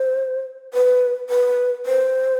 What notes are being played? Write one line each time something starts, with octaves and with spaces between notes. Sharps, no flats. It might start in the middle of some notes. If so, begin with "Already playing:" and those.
Already playing: C5
B4
B4
C5